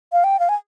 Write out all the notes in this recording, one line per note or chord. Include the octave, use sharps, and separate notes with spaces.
F5
G5
F5
G#5